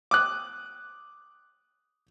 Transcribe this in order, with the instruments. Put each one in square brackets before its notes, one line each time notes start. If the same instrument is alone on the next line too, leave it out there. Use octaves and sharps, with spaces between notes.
[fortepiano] D6 D#6 F#6